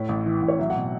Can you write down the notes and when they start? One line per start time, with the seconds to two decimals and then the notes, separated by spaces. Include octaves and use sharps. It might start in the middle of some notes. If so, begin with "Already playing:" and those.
Already playing: A2 E4 C#5
0.09 A1
0.26 E3
0.42 A1
0.48 C#5
0.59 F#3 E5
0.70 F#5
0.76 B2